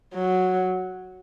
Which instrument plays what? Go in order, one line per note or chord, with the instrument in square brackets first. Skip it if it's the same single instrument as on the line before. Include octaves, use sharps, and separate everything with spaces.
[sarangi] F#3